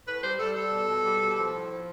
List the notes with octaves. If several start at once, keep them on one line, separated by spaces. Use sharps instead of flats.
A2 B4
G3 C5
G3 A4
G3 A4
B2
B2
G3
B2
F3
A2
F3